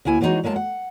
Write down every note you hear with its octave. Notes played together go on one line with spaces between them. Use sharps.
D2 A#3 E4 G#5
E3 F#3 G#3 C4 D#4 F#4
F#3 G#3 A#3 E5 A5
F#5